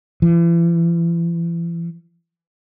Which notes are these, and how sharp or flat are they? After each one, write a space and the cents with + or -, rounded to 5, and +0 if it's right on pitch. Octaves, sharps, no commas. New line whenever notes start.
E3 +40